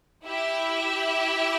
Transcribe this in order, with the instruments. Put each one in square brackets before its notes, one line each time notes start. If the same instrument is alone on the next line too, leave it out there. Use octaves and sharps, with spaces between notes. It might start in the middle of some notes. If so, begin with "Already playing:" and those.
[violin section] E4 G4 E5